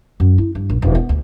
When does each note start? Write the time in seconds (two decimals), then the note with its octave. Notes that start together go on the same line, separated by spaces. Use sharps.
0.20 F#2
0.38 E4
0.55 G2
0.70 A#1
0.82 E1
0.95 B3
1.09 D2